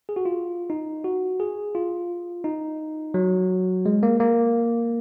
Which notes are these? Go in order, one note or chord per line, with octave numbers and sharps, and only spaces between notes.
G#4
F#4
F4
D#4
F#4
G#4
F4
D#4
F#3
G#3
A#3
A#3